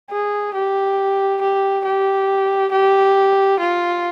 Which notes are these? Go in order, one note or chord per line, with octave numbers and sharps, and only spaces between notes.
G#4
G4
G4
G4
G4
F4